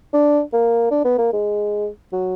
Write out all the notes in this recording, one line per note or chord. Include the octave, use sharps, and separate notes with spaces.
D4
A#3
D4
B3
A#3
G#3
F#3